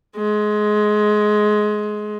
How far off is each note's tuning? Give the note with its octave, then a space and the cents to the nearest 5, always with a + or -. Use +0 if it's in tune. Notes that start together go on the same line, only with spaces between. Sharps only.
G#3 +20